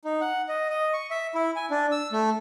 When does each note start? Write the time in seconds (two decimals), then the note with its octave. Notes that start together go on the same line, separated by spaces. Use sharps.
0.05 D#4
0.21 F#5
0.49 D#5
0.69 D#5
0.93 C#6
1.11 E5
1.35 E4
1.56 G#5
1.70 D4
1.92 E6
2.12 A3